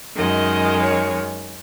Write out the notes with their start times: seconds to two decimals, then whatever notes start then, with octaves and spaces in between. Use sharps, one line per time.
0.15 F#2 D#3 G#3 D#5
0.80 C#5